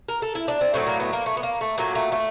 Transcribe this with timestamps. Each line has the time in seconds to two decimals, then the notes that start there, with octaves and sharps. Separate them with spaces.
0.09 A#4
0.22 A4
0.35 E4
0.48 D4
0.61 C4
0.74 A2 F#3 A3 C4
0.87 A#3
1.00 B3
1.13 A#3
1.26 A3
1.37 B3
1.43 A#3
1.61 A3
1.78 A#2 F#3 A3 A#3
1.95 A3
2.12 A3